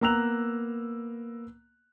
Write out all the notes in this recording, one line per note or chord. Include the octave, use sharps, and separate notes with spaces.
A#3 B3 A#5 E6 F#6 F7